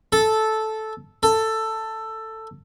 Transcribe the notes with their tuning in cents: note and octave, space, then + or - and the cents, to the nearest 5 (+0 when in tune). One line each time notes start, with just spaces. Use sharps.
A4 -10
A4 +10